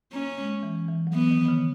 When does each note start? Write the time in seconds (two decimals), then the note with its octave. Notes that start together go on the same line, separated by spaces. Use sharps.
0.13 A#3 C#4
0.38 G#3
0.63 E3
0.88 E3
1.07 F#3
1.14 E3 B3
1.31 D#3
1.42 D#3
1.48 C#3